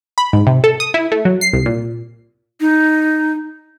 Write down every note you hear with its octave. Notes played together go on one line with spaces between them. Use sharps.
B5
G#2
C3
A4
D#6
E4
A3
F#3
C7
C2
A#2
D#4